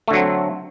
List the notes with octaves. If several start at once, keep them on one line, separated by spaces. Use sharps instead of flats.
D3 F#3 A3 C4